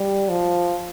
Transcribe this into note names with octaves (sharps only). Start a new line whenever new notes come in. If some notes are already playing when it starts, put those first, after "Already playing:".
Already playing: G3
F3